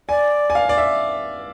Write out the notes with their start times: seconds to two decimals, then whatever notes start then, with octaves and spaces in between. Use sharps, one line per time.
0.09 D5 G#5
0.50 G#5
0.55 F5
0.69 D5
0.78 E5